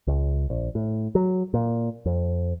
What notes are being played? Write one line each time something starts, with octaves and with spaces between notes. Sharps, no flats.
C#2
A#1
A2
F#3
A#2
F2